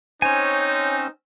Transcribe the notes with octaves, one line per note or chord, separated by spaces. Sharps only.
C4 C#4 D#4 C5 C#5 G#5